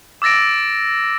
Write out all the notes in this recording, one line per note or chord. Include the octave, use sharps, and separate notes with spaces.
D6 E6 A6 A#6 D7